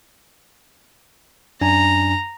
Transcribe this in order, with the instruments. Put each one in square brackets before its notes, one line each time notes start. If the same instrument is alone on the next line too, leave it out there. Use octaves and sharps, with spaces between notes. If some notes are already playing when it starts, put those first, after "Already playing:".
[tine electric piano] F#2 D4 G#5 [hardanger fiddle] A#5